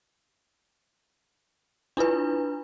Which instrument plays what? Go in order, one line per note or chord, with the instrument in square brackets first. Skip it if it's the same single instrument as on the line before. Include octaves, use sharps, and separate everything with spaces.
[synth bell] D4 E4 F4 B4